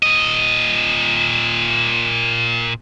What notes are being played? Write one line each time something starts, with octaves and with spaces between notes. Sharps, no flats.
A#2 D#5